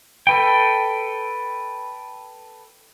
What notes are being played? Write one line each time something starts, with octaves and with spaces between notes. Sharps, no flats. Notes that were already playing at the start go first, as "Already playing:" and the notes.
A4 B4 G5